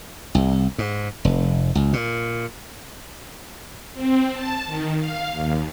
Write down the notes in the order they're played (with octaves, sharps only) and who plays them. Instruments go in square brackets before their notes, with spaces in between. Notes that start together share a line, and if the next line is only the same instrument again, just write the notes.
[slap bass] C2
G#2
F1
C#2
A#2
[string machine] C4
A5
D#3
F5
D#2